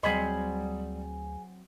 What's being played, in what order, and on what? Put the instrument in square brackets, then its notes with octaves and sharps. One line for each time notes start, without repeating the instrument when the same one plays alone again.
[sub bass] D2 [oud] F#3 C4 D#5 [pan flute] G3 [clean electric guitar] G#4 B5